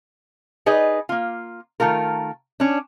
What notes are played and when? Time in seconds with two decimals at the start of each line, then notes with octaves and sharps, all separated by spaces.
0.66 D#4 G#4 B4 D5 D#5
1.09 A#3 F4
1.80 D#3 A3 F4 A#4
2.60 C#4 D4